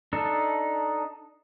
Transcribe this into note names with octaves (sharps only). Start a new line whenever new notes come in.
D4 D#4 A4